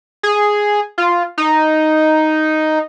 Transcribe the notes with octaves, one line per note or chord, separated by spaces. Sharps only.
G#4
F4
D#4